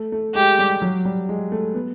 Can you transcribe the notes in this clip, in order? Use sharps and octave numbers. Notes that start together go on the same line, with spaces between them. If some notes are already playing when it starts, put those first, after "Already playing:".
Already playing: A3
A3
G#3 G4
G3
F#3
G3
G#3
A3
B3